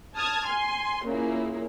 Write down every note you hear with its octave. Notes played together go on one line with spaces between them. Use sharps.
A5 D#6 F6 G#6
G#5 C6
A#2 C#3 A#3 E4 G#4